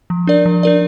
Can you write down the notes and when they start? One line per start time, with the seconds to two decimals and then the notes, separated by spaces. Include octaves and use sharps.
0.10 F3
0.27 D4 A#4 D5
0.46 F3
0.63 D4 A#4 D5